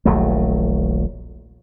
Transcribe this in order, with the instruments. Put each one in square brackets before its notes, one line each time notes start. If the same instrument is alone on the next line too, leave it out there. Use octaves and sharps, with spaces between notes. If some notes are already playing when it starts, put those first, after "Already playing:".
[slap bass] D#1 A#1 F#3 A3